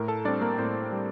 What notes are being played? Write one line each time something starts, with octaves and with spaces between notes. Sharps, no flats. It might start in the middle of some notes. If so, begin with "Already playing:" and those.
Already playing: A2 A#4 A#5
A4 A5
G3 C4 D4 D5
A#3 A#4
A2 C4 C5
G3